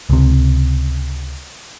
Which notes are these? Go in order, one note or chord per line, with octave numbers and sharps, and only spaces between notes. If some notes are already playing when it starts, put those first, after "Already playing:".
C#2 C3